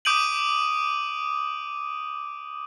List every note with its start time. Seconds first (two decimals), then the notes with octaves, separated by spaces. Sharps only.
0.05 D6 D#6 G6 D7 D#7 F#7